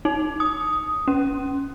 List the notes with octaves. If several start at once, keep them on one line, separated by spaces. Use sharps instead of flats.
D#4
D#6
C#4